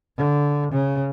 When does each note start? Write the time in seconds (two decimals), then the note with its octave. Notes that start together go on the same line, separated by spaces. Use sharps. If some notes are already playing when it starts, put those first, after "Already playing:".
0.17 D3
0.72 C#3